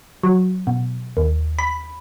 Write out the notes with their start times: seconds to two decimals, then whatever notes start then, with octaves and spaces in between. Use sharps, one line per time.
0.23 F#3
0.67 B2
1.17 D#2
1.59 B5